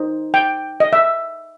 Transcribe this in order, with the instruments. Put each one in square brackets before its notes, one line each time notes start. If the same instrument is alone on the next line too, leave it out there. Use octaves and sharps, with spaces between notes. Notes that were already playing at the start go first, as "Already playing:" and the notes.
Already playing: [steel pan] D#4 C5
G5
D#5
E5